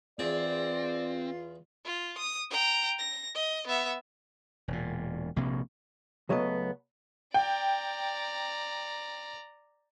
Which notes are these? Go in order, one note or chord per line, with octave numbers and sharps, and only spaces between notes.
E2 C4 F4 G#4 D5
F4
D#6
G5 A#5
A#6
D#5
B3 E5
E1 A#2
A#1 C3 A#3
C#2 F#3 A3 B3 D#5
D5 G5 A#5